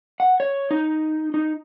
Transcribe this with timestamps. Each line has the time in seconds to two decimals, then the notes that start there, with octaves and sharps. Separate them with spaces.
0.20 F#5
0.40 C#5
0.71 D#4
1.34 D#4